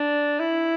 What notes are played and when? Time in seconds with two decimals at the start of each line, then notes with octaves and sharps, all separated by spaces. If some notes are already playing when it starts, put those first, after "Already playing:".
Already playing: D4
0.39 E4